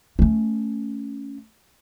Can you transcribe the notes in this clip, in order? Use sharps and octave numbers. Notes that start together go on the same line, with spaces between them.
A3 C#4